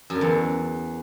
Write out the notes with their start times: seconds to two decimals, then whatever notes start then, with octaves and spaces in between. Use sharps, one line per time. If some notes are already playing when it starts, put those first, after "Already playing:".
0.10 F#2
0.16 D3
0.21 E2